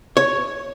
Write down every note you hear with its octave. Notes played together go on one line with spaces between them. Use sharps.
C#5